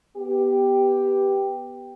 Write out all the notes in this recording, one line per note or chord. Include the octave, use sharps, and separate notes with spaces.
B3 G4